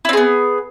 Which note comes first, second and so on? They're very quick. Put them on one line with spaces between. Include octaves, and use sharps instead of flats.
E4 C4 G#4 B3